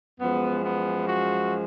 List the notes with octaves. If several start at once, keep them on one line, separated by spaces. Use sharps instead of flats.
F#2 F3 G#3 B3
B3
F#4